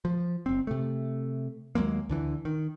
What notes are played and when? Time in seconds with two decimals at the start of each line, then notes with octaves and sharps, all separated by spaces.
0.05 F3
0.46 F#1 C4
0.67 C3 A3
1.75 D#2 F#3 G#3 A#3
2.09 D2 D3 E3
2.45 D#3